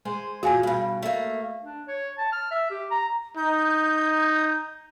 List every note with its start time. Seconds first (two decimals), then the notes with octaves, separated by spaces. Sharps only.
0.05 G#3 C5 G#5
0.43 A#2 F#4 G#4 F5 G#5
0.63 G2 B2
1.02 A3 A#3
1.63 D4
1.88 C#5
2.18 A5
2.32 F6
2.51 E5
2.70 G4
2.91 A#5
3.37 D#4 G6